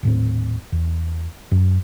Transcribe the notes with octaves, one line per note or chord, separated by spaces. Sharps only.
D#1 A2 C4
E2
F#2